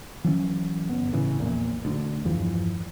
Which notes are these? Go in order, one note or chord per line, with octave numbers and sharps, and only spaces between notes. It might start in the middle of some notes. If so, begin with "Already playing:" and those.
E3 F#3 A3 C#4
G1 B3
A2 C#3 E3
A#1 E2 A#2
D2 D4
E2 G2 E3 F3